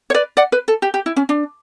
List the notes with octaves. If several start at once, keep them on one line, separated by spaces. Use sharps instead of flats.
C#5
B4 D5
D5 F#5
B4
A4
G4
G4
E4
C#4
D4